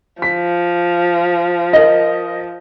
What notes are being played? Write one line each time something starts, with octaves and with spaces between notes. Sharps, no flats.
F3 B6
A#4 D#5